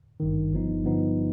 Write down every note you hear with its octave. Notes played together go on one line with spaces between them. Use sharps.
G#1 G2 D#3
G1 G2 F3 B3 D#4
G2 D3 F3 B3 D#4